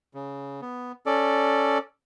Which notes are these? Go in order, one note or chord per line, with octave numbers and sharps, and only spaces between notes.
C#3
B3
C#4 A4 D5